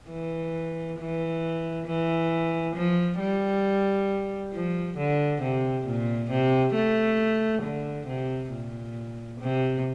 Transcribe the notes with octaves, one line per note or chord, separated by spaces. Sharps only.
E3
E3
E3
F3
G3
F3
D3
C3
A#2
C3
A3
D3
C3
A#2
C3